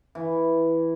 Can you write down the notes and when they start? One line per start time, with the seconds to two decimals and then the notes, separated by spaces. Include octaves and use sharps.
0.15 E3